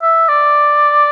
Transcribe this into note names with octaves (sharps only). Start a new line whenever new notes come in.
E5
D5